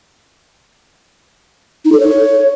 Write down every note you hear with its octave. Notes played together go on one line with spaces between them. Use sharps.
D#4
A4
C#5